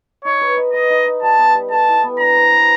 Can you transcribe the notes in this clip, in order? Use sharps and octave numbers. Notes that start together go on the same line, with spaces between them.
D#4 C#5
B4
D#4
B4 D#5
D#4
D#4
G3 A5
B3
G3
A4 A5
E4
B3
D4 A#5
C5
B3